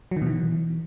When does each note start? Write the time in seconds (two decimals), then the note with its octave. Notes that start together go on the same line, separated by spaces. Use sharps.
0.11 F#3
0.17 D#3
0.22 B2
0.27 E3